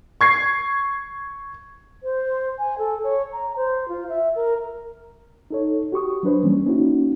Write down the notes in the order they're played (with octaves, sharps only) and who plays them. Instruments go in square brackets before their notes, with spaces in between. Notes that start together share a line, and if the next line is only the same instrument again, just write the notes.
[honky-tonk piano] C#6 G#6 C7
[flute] C5
G#5
A4
C#5
A#5
C5
F4
E5
A#4
[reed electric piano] D#4 A4 C#5
F#4 G4 C#6 D#6
F#3 D4 B4 C5
E3 G3 A#3 C4 C#4
A#3 C#4 D#4 E4 F#4